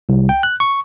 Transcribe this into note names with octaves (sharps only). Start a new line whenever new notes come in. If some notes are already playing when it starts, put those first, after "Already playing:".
C2
G5
F#6
C#6